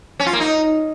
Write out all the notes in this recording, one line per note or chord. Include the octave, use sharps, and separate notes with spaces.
C#4
F4
A#3
D#4